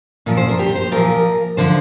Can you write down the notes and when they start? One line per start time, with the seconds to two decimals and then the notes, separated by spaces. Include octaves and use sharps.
0.26 A#2 F3 A#4
0.37 C5
0.49 A#4
0.59 G4
0.69 A#4
0.75 C5
0.92 A#2 F3 A#4
1.57 D3 F3 C5